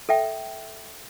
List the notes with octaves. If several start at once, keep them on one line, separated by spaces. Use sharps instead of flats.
A4 E5 G5